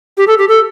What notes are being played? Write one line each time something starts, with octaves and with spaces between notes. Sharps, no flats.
G4
A4
G4
A4